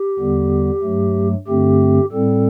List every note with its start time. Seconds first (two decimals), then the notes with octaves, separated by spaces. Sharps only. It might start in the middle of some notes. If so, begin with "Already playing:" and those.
Already playing: G4
0.19 E2 D3 G3 B3
0.83 G2 F#3 A3
1.48 G2 D3 A3 C4 G4
2.12 A2 G3 C4 A4